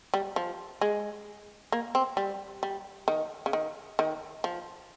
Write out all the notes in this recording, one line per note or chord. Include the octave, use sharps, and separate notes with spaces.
G3
F3
G#3
A#3
C4
G3
G3
D#3
C#3
D#3
D#3
F3